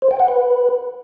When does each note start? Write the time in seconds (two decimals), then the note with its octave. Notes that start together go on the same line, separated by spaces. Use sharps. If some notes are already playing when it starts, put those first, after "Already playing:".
0.02 C5
0.11 G5
0.20 F#5
0.28 B4